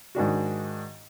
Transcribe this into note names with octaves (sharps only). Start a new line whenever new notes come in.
G#2 D#3 D4 F#4